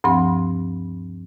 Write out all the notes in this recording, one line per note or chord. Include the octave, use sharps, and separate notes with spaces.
D2 G2 F3 C4 C6